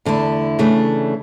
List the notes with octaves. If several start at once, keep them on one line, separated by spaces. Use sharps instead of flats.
E2 D3 A3 E4
C#3 E3 A3 D4